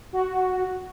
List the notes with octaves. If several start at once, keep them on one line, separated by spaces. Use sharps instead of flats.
F#4